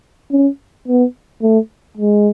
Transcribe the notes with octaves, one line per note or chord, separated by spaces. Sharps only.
C#4
B3
A3
G#3